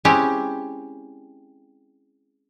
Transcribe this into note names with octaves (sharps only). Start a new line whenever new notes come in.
G#3 C4 C#4 E4 G4